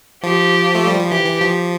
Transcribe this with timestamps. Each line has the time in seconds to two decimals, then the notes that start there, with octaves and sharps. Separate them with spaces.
0.23 F3 G4
0.75 A3
0.87 G3
0.99 F3
1.11 E3 G4
1.26 E3
1.41 F3